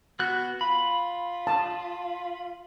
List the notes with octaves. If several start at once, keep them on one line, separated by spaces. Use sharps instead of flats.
B3 F#4 F#6
F4 B5
A5